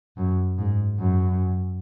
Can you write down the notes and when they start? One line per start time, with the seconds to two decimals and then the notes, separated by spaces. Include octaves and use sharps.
0.17 F#2
0.58 G#2
0.99 F#2